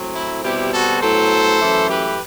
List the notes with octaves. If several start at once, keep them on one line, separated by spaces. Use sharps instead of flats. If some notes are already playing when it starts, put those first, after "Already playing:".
Already playing: A2 F#3 C4
E4
B2 G3 C4 E4 G4
F#4 A4
A2 F#3 B3 A4 C5
F#2 E3 A3
G4 B4